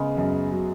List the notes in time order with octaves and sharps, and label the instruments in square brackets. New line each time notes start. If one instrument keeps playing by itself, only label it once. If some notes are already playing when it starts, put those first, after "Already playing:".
Already playing: [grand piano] C#3 [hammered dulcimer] G#3 B3
[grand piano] F#2
F#3